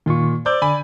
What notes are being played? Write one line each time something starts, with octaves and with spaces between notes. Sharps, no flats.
A#2 D#3 F4 C#6
C5 D5 D6 E6 G6
D3 G#5 B5